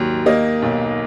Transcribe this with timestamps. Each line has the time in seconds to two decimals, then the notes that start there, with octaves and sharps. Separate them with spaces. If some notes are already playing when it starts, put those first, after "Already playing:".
Already playing: D#2 G#2 F#3
0.26 A#3 D#5
0.62 B1